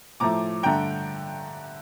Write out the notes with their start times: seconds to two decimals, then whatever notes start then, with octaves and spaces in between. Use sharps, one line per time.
0.20 A2 F3 A3 A#5 D6
0.63 G2 D3 A3 G5 A#5